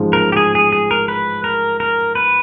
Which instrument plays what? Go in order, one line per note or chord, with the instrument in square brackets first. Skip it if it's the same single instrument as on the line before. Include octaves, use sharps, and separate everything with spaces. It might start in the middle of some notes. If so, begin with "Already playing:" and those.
Already playing: [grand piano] A1 G#2 F3 G#3
[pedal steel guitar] A#4
G4
G#4
G#4
G#4
A#4
B4
A#4
A#4
B4